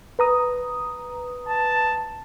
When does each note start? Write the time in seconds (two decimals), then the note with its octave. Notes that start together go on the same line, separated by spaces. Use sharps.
0.19 B4 A#5 D#6
1.49 A5